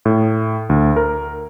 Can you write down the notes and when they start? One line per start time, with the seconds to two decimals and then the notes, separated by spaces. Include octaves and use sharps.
0.05 A2
0.69 D2
0.96 A#4